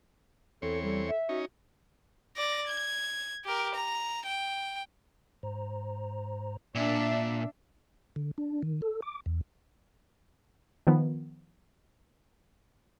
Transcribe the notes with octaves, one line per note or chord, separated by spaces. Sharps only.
E2 C4 A4 C#5
G3 A4
E5
C#4 D#4 F#4
D5 A#6
G#6
G4 A#4
A#5
G5
G#2 C5 A#5
A#2 D4 E5 D6
D3
D4
D#3
A4
D6
E2
D#3 F3 B3